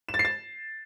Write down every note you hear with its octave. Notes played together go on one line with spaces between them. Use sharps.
E7
A6
C7
A6